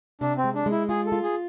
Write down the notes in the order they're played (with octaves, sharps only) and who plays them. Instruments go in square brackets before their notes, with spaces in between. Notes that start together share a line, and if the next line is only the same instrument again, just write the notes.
[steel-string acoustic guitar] C3 [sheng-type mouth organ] D4
[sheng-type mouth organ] C4
[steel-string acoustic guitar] G#3
[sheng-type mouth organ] D4
[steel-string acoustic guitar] G#3
[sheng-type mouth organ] E4
[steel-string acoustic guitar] F4 [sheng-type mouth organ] G#4
[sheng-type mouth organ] A4
[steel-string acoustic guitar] F4
[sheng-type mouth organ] G#4